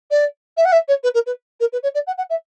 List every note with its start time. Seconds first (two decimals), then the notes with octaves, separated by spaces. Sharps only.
0.11 D5
0.57 E5
0.65 F#5
0.72 E5
0.88 C#5
1.03 B4
1.14 A#4
1.26 B4
1.60 A#4
1.72 B4
1.83 C#5
1.94 D5
2.07 F#5
2.18 F#5
2.30 E5